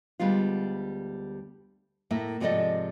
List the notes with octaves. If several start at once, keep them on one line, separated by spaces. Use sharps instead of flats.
D2 G3 G#3 B3 F4
A2 A#3 E5
G#2 C3 F3 A4 D5 D#5